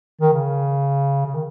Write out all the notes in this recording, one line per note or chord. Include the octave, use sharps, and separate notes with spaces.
D#3
C#3
C#3
D#3